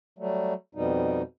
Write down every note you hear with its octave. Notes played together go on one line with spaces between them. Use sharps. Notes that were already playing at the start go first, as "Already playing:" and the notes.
F#3 G3 A3
F2 B2 G3 D#4